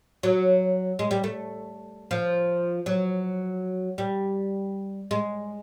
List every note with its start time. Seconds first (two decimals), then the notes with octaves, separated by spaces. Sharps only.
0.23 F#3
0.99 G#3
1.11 G3
1.24 A3
2.11 F3
2.86 F#3
3.98 G3
5.11 G#3